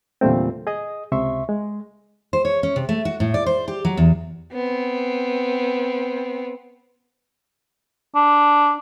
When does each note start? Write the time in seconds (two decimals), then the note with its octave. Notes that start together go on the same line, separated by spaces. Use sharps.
0.21 E2 A#2 D3 G3 A3 C4
0.67 G#4 D#5 D#6
1.12 C#2 C3 E5 C6 C#6
1.49 G#3
2.33 C5
2.45 C#5
2.63 C#4
2.76 C3
2.89 A3
3.05 F#4
3.20 A2
3.34 D5
3.46 C5
3.68 G4
3.85 F#3
3.97 E2
4.53 B3 C4
8.16 D4